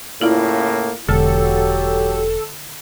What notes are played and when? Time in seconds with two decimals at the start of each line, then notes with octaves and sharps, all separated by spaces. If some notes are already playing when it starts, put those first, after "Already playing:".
0.21 A2 C#3 A#3 E4 F4 D5
1.09 E1 D3 F#3 F#4 G4 A4 A5